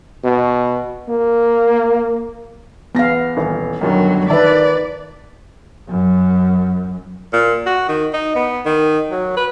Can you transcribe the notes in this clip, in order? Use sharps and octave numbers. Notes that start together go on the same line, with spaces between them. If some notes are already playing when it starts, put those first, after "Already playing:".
B2
A#3
E2 B3 F5 A#6
D#1 E3
G1 F#2 D#3 F#3
D#3 B4 D5 E5 A5
F#2
A#2
F#4
D#3
D#4
B3
D#3
F#3
B4